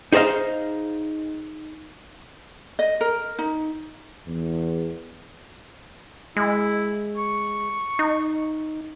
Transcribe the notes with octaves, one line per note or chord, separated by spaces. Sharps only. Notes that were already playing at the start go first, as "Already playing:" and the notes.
D#4 G#4 C5 D#5 F5
D#5
A#4
D#4
E2
G#3 E4
C#6
D#4